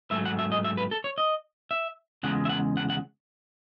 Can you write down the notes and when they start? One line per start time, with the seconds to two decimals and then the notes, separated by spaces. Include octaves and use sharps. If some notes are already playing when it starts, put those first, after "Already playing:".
0.11 G#2 F#3 A3 E5
0.25 F#5
0.39 E5
0.52 D#5
0.64 E5
0.77 B4
0.91 A4
1.04 C#5
1.18 D#5
1.71 E5
2.23 E2 C#3 G#3 F#5
2.45 E5
2.49 F#5
2.77 F#5
2.90 F#5